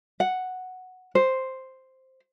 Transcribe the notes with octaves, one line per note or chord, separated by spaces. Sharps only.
F#5
C5